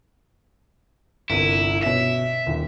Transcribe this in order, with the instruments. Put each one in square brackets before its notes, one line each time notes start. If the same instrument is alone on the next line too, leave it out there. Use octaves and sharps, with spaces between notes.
[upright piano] G1 C2 D#7 [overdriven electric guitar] E4
[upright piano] B2 C#4 [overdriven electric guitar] E5
[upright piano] D#1 D#2